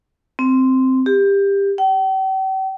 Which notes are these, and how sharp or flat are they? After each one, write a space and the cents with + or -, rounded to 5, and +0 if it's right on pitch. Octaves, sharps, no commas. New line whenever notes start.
C4 -5
G4 +20
G5 -45